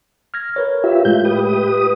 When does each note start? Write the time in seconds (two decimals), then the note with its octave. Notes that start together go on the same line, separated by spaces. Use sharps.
0.34 F6 G#6 A#6
0.56 A#4 B4 C#5
0.84 F4 G4 E5
1.05 A2 G#3 A3 F4 G6
1.25 G4 B4 D#6